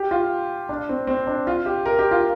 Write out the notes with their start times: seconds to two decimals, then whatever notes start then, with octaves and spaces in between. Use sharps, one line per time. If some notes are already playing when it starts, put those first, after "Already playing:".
Already playing: G4
0.11 F4
0.69 D4
0.89 C4
1.07 C4
1.27 D4
1.47 F4
1.66 G4
1.86 A#4
1.99 G4
2.11 F4